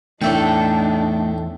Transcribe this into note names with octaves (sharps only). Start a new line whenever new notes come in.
E2 A2 A3 D4 D#4 A4 E5 G5